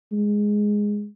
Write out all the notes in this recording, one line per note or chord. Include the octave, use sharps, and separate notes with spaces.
G#3